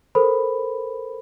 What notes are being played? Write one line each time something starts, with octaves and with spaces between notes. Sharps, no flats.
A4 A#4 C5 B5